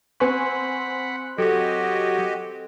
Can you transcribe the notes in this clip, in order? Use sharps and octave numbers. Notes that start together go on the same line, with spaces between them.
C4 F#5 G#5 B5 C#6
F#3 F#4 G4 A4 D#5